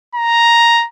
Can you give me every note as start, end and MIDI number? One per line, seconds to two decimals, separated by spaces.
0.15 0.86 82